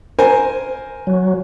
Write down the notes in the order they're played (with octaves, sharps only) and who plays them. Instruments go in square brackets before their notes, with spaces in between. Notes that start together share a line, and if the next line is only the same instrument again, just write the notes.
[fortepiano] A#4 C5 G#5
[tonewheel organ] F#3